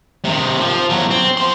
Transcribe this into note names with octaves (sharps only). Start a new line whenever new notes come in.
C3 D#3
F3
E2 F#3
C4
F3 C6